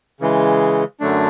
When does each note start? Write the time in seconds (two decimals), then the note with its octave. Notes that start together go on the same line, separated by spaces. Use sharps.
0.20 C#3 E3 G#3
1.00 F#2 D3 F#3 A3 D4